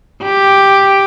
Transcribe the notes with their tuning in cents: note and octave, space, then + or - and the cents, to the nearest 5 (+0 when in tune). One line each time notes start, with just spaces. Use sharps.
G4 +0